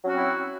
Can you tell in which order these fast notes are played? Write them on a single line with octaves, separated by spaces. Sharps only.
F#3 C#4 F#4 C4 E4